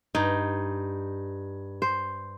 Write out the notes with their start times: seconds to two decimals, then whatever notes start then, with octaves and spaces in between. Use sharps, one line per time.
0.15 G2 D#4
1.82 C5